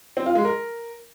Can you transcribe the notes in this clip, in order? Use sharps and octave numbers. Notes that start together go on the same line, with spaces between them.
C4
F4
G#3
A#4